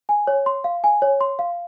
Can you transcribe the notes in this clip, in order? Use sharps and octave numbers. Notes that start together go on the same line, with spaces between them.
G#5
C#5
C6
F5
G#5
C#5
C6
F5